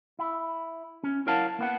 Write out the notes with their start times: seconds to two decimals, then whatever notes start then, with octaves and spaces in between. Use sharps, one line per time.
0.19 E4
1.04 C#4
1.27 E4 A#4 C#5 F5 F#5 A5
1.59 A#3 B3 F#5